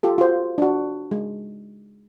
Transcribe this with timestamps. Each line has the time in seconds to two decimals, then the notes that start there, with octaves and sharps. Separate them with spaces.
0.03 F4 G4 A4
0.18 F4 F#4 C5
0.58 D4 F#4
1.11 G#3